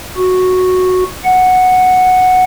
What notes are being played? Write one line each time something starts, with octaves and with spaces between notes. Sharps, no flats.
F#4
F#5